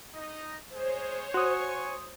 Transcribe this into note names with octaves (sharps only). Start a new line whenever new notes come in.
D#4 D#5
G#3 G#4 C5 C#5
F#4 G#5 C6 C#6 D#6